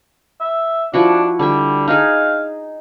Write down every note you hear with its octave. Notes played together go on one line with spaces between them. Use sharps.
E5
F3 D4 E4 F#4
D3 G3 E5
D#4 G#4 F5